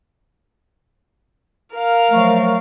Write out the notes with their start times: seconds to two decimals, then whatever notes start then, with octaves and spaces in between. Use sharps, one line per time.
1.75 A#4 F5
2.10 F3 F#3 A3